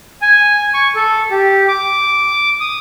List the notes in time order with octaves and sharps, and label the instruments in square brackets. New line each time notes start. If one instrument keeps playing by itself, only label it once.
[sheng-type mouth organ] G#5
C#6
A4
G4
D6
D#6